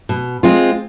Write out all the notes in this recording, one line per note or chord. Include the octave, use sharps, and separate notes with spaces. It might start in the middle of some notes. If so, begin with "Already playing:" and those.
B2
G#3 C4 F4